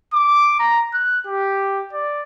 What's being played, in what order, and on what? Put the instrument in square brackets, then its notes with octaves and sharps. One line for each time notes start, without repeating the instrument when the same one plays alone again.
[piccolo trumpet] D6
A#5
F#6
G4
D5